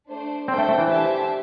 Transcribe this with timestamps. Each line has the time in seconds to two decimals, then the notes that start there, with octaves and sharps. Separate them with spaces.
0.09 A3 D4 C5
0.48 C4 D4 A4 C5 G5
0.58 A3
0.69 A3
0.78 E3
0.88 D4 G4 C5 E5 A5